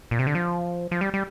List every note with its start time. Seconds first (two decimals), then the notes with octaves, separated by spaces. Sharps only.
0.11 A#2
0.19 C3
0.27 D3
0.35 F3
0.91 F3
1.01 G3
1.14 G3